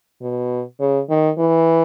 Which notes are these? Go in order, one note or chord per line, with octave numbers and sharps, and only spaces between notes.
B2
C#3
D#3
E3